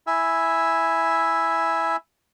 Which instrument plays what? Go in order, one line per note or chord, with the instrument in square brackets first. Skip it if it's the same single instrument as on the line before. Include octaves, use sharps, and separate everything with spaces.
[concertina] E4 E5 G#5 E6